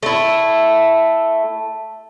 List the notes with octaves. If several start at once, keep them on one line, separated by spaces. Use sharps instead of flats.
A3 E4